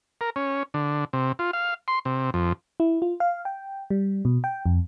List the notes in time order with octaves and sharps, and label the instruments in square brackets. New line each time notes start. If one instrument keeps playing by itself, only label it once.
[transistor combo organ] A#4
C#4
D3
C3
F4
F5
C6
C3
F2
[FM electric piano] E4
F4
F5
G5
G3
B2
G5
F2